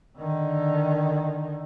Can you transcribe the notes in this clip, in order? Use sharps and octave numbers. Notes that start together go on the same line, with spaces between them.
D3 D#3